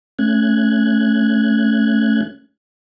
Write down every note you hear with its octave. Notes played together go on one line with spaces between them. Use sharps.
A3 C#4 F#6 G#6